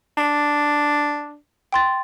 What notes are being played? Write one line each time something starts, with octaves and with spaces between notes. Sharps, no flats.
D4
G5 C6 A6